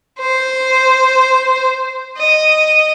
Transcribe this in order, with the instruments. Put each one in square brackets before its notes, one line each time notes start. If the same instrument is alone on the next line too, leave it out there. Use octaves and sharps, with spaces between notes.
[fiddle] C5
D#5